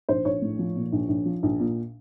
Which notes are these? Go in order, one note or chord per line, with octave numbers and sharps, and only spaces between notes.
A#1 C5
A#1 C#5
A2
F3
A#2
A#1
A#1
F3
A#1
A#2